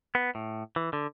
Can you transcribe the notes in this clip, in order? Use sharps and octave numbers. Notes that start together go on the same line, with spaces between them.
B3
A2
E3
D3